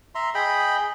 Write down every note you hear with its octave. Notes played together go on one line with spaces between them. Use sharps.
E5 A#5 C6
G#4 D#5 G5 B5